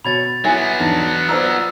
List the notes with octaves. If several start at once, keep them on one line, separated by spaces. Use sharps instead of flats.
B2 C#5 B5 G#6 A6
F#3 B3 E4 G#5
E2 D4 D#4 D5
F4 C5 D5 A#5 E6 F6